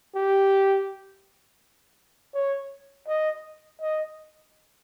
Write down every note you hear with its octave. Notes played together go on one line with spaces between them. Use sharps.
G4
C#5
D#5
D#5